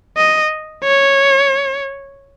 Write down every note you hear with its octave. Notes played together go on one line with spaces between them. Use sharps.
D#5
C#5